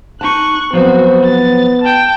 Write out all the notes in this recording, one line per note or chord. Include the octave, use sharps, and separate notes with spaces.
D#4 A5 C#6 F#6
F3 F#3 B3 C4 F#4
A6
G5 A5